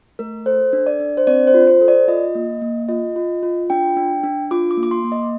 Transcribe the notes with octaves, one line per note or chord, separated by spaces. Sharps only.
A3 A#4
A4 C5
D4
D5
D4
C5
C4 D5
C5
F4
C5
A4
D5
F4 D#5
A#3
A#3
F4 D#5
F4
F4
D4 G5
D4
D4
F4 D6
D6
A#3
D6
C6
A#3
D#5